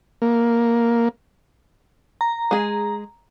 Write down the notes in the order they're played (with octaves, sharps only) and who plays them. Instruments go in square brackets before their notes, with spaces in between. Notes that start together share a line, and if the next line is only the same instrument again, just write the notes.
[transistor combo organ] A#3
[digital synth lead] A#5
[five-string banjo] G#3 G#4